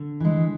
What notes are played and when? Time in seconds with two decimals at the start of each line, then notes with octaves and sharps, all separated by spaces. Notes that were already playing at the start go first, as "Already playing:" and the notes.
Already playing: D3
0.20 E3 G#3